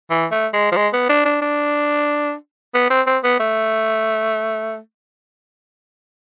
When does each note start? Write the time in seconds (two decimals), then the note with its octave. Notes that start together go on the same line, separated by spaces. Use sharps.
0.11 E3
0.31 A3
0.53 G#3
0.72 F3
0.76 G#3
0.93 B3
1.09 D4
1.25 D4
1.42 D4
2.74 B3
2.90 C4
3.06 C4
3.23 B3
3.40 A3